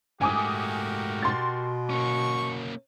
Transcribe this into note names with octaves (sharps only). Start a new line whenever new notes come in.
G#2 A3 F#4 G4 A#4 G#5 D6 D#6
B2 C6 A6
A#3 C#4 C#6